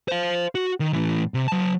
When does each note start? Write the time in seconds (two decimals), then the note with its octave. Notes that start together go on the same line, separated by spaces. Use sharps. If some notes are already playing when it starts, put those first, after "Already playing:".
0.08 C5 F5
0.55 F#4
0.80 D#3
0.93 A2 E3
1.34 C3
1.48 F#3 A5